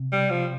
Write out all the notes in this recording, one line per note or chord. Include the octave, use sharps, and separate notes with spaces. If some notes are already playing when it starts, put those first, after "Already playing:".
Already playing: C3
G3
F3